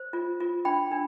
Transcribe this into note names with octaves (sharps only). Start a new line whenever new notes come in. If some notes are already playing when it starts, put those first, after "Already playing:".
Already playing: C5
F4
F4
D4 G5 B5
D4